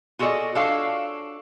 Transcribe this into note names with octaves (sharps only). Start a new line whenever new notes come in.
F4 F#4 G#4 A4 D5 D#5
D4 F4 F#4 A4 C#5 F5